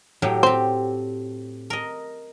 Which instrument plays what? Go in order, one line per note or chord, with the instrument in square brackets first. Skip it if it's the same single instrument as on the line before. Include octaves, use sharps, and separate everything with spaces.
[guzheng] A2 F#3 G4
[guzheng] C4 G4 [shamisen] C5
[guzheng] A#4 D#5